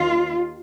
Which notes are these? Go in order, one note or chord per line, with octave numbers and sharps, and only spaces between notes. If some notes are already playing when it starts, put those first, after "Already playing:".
Already playing: D#2 D#3 F4